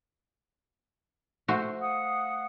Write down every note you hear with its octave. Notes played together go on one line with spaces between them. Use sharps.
A3 F#4 C5
F5 F#5 D#6